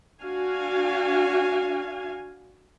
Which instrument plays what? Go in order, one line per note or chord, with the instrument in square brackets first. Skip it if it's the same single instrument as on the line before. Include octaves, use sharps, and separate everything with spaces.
[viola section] D4 F#4 F5 G#5